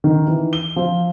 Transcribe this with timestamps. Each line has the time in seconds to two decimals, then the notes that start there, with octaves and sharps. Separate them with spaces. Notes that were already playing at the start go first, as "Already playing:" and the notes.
0.04 D#3
0.27 E3
0.53 G7
0.76 F3